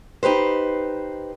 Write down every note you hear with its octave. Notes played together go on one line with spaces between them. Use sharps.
D#4 G4 B4 C5